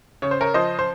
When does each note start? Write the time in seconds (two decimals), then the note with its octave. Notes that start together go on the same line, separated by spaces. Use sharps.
0.22 C#3 C#5
0.31 C5
0.41 A#4 C#5
0.54 F3 C5 D#5
0.79 C5